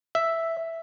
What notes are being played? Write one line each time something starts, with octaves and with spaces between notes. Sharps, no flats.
E5